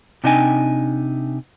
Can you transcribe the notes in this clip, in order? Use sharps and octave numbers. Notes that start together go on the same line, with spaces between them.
C3 D4 D#4 D#5 G5 G#5